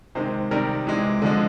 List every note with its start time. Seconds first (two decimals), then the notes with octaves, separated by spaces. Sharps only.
0.15 C3 D#3 G#3 C5
0.51 C3 D#3 G3 A#4
0.87 C3 E3 G#3
1.22 D3 F3 G#3